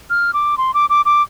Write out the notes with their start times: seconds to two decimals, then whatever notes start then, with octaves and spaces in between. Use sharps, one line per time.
0.10 F6
0.34 D6
0.58 C6
0.74 D6
0.90 D6
1.05 D6